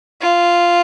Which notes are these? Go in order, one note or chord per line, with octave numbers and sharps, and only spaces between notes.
F4